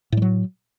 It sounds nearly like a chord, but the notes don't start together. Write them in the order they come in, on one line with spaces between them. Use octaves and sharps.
A2 G3 F#3